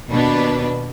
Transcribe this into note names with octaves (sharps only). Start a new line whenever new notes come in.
D#2 B2 D4 B4